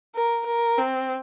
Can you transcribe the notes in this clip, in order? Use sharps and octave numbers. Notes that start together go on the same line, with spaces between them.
A#4
A#4
C4